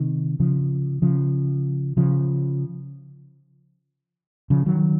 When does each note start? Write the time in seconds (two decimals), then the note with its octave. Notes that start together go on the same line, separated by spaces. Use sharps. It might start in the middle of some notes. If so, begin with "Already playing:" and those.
Already playing: C3 D#3
0.40 C#3 F3
1.02 C#3 F3
1.97 C#3 F3
4.50 C#3 F3
4.66 D#3 F#3